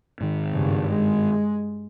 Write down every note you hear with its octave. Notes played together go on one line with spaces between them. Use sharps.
G#2 D#3
G2 C#3
G#3